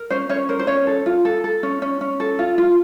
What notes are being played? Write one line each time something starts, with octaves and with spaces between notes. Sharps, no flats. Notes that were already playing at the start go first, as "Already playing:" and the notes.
Already playing: A#4
C#4 C5
C#4 C#5
A#4 C5
C5
C#4 C#5
A4
F4
A4
A4
C#4
C#4
C#4
A4
F4
F4